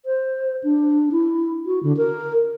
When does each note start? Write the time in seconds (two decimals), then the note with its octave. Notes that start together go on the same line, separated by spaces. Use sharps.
0.06 C5
0.63 D4
1.12 E4
1.66 F#4
1.83 D3
1.97 A#4